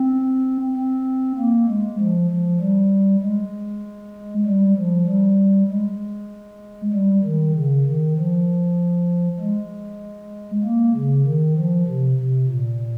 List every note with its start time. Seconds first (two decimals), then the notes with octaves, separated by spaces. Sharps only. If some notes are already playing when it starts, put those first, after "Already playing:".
Already playing: C4
0.77 C4
1.38 A#3
1.68 G#3
1.99 F3
2.30 F3
2.61 G3
3.23 G#3
4.46 G3
4.77 F3
5.08 G3
5.71 G#3
6.94 G3
7.24 D#3
7.55 C#3
7.86 D#3
8.17 F3
9.40 G#3
10.64 A#3
10.94 C#3
11.25 D#3
11.56 F3
11.87 C3
12.18 C3
12.48 A#2